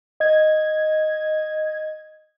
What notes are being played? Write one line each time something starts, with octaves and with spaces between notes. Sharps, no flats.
D#5 G#6